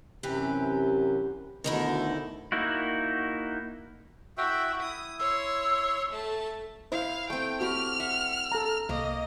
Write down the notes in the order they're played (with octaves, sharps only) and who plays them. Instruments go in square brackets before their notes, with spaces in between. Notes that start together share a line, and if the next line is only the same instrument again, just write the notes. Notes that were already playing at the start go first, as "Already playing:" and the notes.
[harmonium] F#2 C3 [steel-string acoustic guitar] E3 G4 B4
[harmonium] D2 B2 D3 [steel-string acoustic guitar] D#3 D#4 E4
[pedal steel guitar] A#3 D#4 E4 F#4
[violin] E4 [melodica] F#4 E5 G5
[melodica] E4 [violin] D#6
[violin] C#5 C6 [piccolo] E6
[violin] A3 A5
[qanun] E4 [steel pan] C5 [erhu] F5
[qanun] A3 C4 [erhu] G5
[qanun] C4 G4 B5 [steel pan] F#4 [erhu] F6
[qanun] E5 F#5
[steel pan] A4 A#5
[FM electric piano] C2 [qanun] A#3 [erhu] D#5